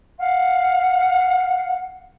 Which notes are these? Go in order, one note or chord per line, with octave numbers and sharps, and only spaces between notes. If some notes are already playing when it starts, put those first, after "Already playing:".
F5 F#5